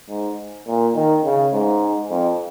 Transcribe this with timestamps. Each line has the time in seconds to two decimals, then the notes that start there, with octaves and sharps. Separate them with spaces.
0.09 G#2
0.66 A#2
0.95 D#3
1.24 C#3
1.53 G#2
2.10 F2